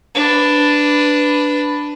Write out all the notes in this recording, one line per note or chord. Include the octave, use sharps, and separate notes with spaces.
D4 B4